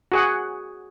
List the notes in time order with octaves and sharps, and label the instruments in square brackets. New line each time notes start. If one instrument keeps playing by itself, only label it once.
[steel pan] F#4 G#4 F#5